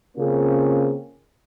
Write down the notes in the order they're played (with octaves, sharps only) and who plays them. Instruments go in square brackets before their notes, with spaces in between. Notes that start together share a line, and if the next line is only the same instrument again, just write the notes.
[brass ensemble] C#3 A#3 C4 C#4 F4 G#4